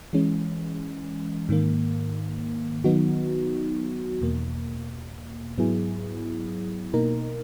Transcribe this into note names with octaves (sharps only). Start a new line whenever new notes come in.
E3 G#3 C#4
G#2 D#3 A#3
D#3 F#3 B3 D#4 F#4
E2 B2 A#3
G#2 F#3 B3 E4 G#4
B2 A#3 D#4 A#4